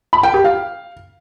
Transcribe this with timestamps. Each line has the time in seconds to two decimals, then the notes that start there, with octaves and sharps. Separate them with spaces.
0.13 B5
0.23 G5
0.34 G4
0.44 F5